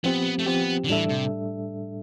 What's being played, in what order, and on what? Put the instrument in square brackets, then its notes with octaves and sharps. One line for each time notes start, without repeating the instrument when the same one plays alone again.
[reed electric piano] F3 C4 G4 [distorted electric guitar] B3
[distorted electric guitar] A3
[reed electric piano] F3 C4 G4 [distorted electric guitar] B3
[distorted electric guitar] D3
[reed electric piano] A2 G3 D4 A4 E5 [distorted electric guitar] E3
[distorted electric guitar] C3